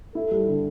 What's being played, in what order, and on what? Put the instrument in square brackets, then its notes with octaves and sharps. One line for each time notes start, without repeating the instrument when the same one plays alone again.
[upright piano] E4 [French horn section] A4
[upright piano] G3
D3